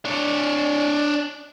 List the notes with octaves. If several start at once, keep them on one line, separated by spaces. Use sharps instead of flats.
D4 C#5